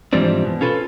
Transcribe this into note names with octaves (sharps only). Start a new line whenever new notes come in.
G#2 E3 F3 G3 C4 D4
B2
C#4 F4 A4 B4